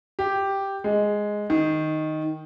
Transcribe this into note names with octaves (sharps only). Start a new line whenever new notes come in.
G4
G#3
D#3